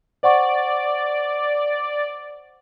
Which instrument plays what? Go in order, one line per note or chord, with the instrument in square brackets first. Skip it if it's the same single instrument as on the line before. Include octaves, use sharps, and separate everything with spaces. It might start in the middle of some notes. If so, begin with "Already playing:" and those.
[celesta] C5 F#5 C#6 [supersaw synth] D5